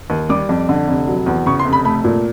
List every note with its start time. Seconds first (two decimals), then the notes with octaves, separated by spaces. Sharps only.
0.10 D#2
0.29 G3 D6
0.49 F2
0.69 D3
0.88 F1
1.07 F#3
1.26 E2
1.46 C#3 C#6
1.59 C6
1.65 F1
1.73 B5
1.85 A3 B5
2.04 A#2